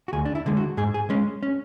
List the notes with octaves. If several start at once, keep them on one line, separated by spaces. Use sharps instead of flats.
F#4
D2 G#4
D4
E4
D3 G#3
F#4
G#2 G#4
G#4
G#3 C#4
C#4